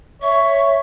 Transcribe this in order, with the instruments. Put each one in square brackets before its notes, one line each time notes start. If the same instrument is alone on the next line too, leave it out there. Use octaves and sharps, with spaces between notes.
[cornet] C#5 [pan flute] E5